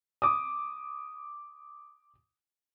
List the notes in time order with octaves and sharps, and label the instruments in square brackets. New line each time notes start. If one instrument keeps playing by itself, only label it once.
[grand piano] D6 D#6